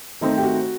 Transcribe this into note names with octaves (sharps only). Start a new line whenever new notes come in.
D#3 A3 C4 D#4
G4
F#4